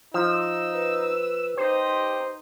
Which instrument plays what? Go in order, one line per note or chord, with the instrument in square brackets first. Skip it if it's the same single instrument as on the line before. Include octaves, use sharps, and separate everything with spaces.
[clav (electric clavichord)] F3 [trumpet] D#4 [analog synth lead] E6
[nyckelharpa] B4
[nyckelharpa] D#4 D#5 [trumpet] G4 [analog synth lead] C5